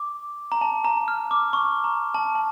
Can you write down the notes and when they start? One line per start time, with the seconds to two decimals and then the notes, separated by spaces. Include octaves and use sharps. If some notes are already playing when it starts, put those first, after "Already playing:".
Already playing: D6
0.52 A#5
0.61 A5
0.84 A#5
1.08 F6
1.31 D6
1.53 C#6
1.84 A#5
2.14 A5
2.35 A5